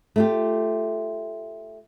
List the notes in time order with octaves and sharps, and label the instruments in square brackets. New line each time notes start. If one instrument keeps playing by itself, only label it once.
[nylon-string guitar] A3 F4 G4